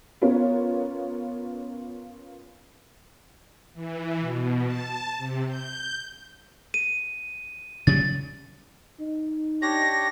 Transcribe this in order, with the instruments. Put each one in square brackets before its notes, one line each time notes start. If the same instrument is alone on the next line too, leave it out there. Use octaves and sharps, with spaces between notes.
[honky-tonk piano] B3 C#4 F4 A#4 C#5
[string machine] E3
B2
A5
C3
G6
[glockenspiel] D#7
[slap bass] C#3 F#3 G3 [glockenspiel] A6
[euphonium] D#4
[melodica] D4 G4 C#5 [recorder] A#6